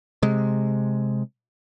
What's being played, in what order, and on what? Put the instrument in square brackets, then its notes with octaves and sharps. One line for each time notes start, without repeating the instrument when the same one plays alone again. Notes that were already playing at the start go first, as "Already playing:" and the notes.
[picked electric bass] C3 G#3